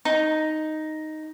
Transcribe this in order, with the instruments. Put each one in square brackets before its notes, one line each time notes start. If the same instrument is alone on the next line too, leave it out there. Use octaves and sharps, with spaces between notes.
[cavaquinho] D#4